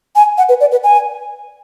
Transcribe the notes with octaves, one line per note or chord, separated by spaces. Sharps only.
G#5
F#5
B4
D5
B4
G#5